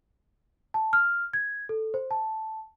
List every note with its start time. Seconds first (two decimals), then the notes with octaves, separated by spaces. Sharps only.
0.74 A5
0.93 F6
1.34 G#6
1.69 A4
1.94 C5
2.11 A5